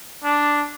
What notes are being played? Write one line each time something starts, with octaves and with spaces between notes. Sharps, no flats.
D4